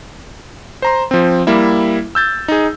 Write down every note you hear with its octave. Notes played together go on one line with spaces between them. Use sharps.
C5 A#5 C6
F3 C4
G3 A#3 E4 E5
E6 G6 A6
D#4 G#4